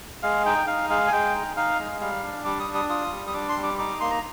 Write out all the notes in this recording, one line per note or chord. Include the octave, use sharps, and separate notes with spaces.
G#3 F5
D#4 G5
D#4 F5
G#3 F5
G#5
G#3 G5
D#4
D#4 F5
G#3
G3 F5
D4
G3 D6
D#6
D4
D#6
F4 D#6
G3
D#6
D4 D6
C6
G3
D6
D#4 D6
A#3 C6
A#5